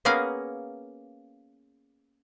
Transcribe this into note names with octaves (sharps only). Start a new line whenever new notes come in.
A#3 B3 C#4 G#4 A#4 F5